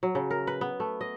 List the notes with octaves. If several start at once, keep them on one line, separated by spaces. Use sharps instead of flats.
F#3
C#3
A#4
B4
B3
A3
D#5